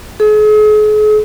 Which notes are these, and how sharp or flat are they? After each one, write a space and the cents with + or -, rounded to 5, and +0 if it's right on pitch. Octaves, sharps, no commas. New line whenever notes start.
G#4 +40